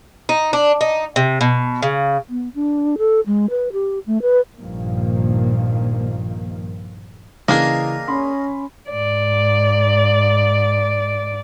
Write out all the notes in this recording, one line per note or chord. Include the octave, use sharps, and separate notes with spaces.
D#4
D4
D#4
C3
B2
C#3
B3
D4
A4
G#3
B4
G4
A3
B4
A#1 G2 D#3 F3 A#3
C#3 E3 A#3 D4 G#4 D#5 F5
C#4 B5 C6
G#2 D5